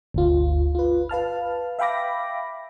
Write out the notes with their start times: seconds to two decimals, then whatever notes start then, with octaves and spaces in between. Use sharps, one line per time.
0.14 G1 D2 F4
0.75 F4 B4
1.09 B4 F5 A5 F6
1.79 E5 F5 G5 B5 D6 A#6